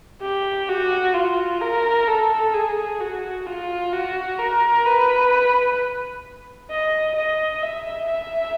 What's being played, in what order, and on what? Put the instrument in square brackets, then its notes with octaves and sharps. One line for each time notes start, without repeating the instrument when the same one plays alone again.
[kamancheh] G4
F#4
F4
A#4
A4
G#4
F#4
F4
F#4
A#4
B4
D#5
D#5
E5
E5